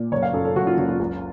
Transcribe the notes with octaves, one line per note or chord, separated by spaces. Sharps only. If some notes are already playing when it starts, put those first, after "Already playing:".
Already playing: A#2
F#1 C#5
F5
F#2 A4
A4
F#1 F#4
F4
F#1 F4
F4
C#2